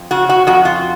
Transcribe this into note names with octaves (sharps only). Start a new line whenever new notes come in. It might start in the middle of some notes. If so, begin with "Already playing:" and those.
Already playing: F2
C#3 F#4
F#4
F2 F#4
F4